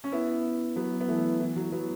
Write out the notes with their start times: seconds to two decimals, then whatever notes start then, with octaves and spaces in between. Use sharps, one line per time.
0.04 C#4
0.12 B3 E4
0.76 F#3 B3
1.01 B3
1.08 E3 A3
1.40 E3
1.56 F#3
1.72 F#3 B3